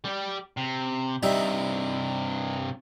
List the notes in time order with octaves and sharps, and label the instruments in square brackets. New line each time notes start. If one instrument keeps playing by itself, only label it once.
[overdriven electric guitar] G3 G4
C3
[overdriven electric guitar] G2 C3 [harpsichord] G3 D#4 E5